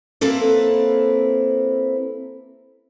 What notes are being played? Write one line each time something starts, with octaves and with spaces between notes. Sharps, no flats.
A#3 C4 E4 A4 B4